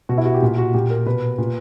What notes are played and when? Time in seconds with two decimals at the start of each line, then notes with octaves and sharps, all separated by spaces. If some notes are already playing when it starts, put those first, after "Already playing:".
0.09 B2 F#4
0.18 E4
0.25 F#4
0.34 G4
0.42 A#2
0.58 F#4
0.74 A#2 G4
0.90 A#4
1.06 B2 B4
1.38 A#2